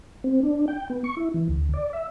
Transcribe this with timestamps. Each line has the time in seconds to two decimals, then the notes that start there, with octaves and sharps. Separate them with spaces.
0.24 C4
0.43 D4
0.68 G5
0.90 B3
1.04 C#6
1.17 E4
1.34 E3
1.49 D2
1.74 D5
1.93 E5